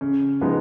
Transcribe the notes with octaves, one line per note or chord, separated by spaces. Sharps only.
C#3
F3 G#3 B3 D#4